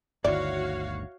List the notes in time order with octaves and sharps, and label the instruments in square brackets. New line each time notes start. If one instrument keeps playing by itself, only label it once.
[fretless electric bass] G1 D2 D#3 [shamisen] E4 D5 [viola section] F#4 C#5 F5